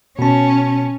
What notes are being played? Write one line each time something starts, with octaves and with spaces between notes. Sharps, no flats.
B2 C#4 A5